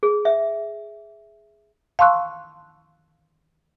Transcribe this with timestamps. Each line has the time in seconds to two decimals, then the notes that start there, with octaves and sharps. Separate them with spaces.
0.03 G#4
0.25 E5
1.99 F5 A5 C6 C#6 E6 F#6